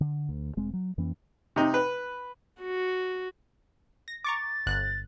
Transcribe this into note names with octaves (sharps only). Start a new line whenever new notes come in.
D3
D2
E1 G#3 C4
F#3
F2 E3 A#3 C#4
C3 D#4
B4
F#4
A#6
A#5 C#6 D6 A6
G1 F#6